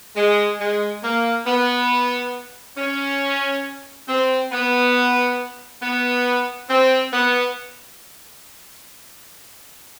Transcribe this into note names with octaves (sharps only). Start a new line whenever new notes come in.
G#3
G#3
A#3
B3
C#4
C4
B3
B3
C4
B3